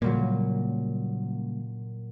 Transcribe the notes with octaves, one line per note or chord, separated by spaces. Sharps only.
A#2 C#3 F#3 G3 A#3